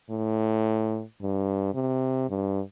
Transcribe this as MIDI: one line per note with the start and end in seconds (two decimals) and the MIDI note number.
0.11 1.03 45
1.22 1.69 43
1.74 2.29 48
2.29 2.61 43